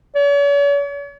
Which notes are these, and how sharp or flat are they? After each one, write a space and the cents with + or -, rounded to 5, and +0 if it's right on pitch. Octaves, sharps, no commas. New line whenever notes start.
C#5 +45